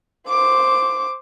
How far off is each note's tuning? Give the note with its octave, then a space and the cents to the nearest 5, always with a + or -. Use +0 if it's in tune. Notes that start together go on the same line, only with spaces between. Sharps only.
C5 +0 D6 +0